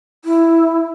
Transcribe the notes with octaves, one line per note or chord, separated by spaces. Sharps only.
E4